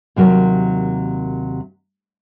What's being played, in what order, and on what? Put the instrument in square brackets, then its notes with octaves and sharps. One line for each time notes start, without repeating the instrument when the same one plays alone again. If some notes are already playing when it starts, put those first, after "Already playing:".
[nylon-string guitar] D#2 C3 F#3 A#4